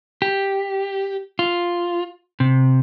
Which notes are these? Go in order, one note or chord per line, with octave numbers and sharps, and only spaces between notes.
G4
F4
C3